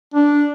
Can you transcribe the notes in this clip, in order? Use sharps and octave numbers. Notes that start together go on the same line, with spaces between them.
D4